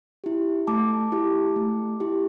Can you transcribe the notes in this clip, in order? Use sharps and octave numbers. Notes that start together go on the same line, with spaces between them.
E4 G4
A3 A5 D6
E4 G4
A3
E4 G4